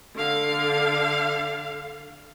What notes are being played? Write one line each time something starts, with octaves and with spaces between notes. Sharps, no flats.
D3 F5